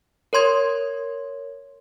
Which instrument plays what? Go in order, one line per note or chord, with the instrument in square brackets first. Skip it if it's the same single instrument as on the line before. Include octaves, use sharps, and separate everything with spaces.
[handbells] A#4 C#5 C6 G#6